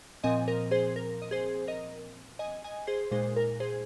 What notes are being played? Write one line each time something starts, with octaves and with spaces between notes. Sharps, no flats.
A#2 F3 C4 D#5 G#5
A#4 D#5
G#4 C5
A#4
D#5
G#4 C5
A#4 D#5
D#5 G#5
D#5 G#5
G#4 C5
A#2 G#3 D#4 G#4 C5
A#4
G#4 C5